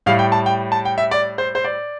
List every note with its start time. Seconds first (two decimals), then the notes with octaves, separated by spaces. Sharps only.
0.06 A2 G3 F5
0.19 G5
0.32 A5
0.46 G5
0.72 A5
0.85 G5
0.98 E5
1.11 D5
1.38 C5
1.55 C5
1.64 D5